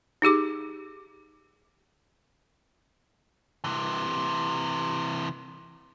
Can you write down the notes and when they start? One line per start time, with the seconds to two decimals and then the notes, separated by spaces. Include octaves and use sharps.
0.22 D#4 G4 G#4 D6
3.64 C3 E3